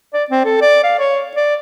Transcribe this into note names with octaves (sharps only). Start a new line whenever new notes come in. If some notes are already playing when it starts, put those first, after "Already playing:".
D5
C4
A4
D5
F5
C#5
D5